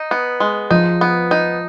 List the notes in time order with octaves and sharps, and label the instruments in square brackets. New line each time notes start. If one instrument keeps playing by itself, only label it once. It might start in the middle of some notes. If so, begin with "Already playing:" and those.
Already playing: [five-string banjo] D#4
B3
G#3
[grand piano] F3 [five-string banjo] D#4
[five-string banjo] B3
D#4